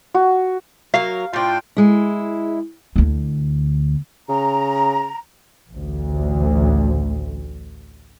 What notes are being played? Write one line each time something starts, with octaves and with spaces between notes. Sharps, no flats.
F#4
F#3 A#3 A#4 F5
A2 D4 F4 G5
G#3 E4
D2 E4
C#3 A#5
A1 D2